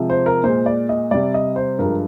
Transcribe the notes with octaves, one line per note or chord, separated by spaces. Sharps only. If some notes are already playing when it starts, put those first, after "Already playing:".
Already playing: C3 F3 G#3
C5
A#4
A#2 G#3 C5
D5
D#5
C3 G3 D5
D#5
C5
G2 F3 G#3 A#4